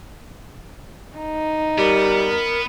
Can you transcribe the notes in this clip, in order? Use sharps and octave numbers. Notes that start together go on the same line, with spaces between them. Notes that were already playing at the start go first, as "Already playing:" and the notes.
D#4
G3 B3 A#4